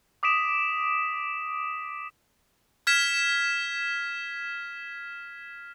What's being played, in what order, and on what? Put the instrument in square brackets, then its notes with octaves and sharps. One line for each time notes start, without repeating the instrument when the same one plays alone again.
[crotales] D6 D#6 B6 D7 E7
F6 G#6 B6 E7